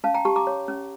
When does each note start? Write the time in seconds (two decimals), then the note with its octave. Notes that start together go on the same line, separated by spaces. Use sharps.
0.04 C#4 F5 A5
0.14 G5 A#5
0.25 G4 A5 C#6
0.36 A#5 D6
0.47 C#5
0.68 C#4